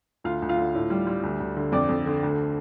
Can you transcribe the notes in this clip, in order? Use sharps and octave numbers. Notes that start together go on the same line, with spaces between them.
D2 F4 F5
D2
F4 F5
D3
A2
G3
G3
D2
D2
D3
F2 D5 D6
F2
D3
D2